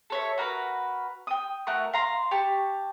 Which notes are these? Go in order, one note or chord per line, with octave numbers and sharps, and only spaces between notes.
A4 C#5 E5
F#4 A#4 B4
G5 D#6
A3 F#4 A#4 C#6
F5 A#5 C6
G4 A5 C#6